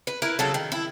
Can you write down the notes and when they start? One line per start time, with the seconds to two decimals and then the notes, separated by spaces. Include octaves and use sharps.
0.07 B4
0.22 E4 A#4 B4
0.39 C#3 F#3 A4
0.54 D#3
0.72 E4